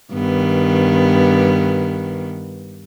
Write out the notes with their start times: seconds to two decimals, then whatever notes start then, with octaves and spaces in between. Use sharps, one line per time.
0.13 G2 D#3 B3